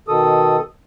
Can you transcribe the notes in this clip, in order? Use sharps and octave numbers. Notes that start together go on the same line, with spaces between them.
B2 D#3 A4 D#6